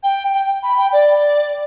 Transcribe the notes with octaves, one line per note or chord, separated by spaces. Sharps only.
G5
G5
B5
G5
D5